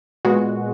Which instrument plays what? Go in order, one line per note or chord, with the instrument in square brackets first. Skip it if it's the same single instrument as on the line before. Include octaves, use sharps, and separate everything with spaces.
[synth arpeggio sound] A#2 G#3 B3 F#4